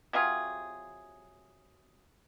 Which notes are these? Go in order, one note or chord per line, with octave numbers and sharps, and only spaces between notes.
C3 F#3 F4 G#4